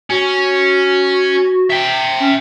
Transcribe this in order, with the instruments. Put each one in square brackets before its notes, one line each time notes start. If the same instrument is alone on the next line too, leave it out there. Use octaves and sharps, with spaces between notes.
[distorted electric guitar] C#4 [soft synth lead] F#4
[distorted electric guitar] E5 G5
[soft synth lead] C#4